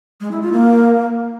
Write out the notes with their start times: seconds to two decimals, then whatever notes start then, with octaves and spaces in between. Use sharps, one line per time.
0.20 G#3
0.31 E4
0.42 F4
0.52 A#3